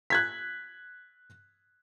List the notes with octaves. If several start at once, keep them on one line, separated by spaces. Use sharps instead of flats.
F#6 G#6 B6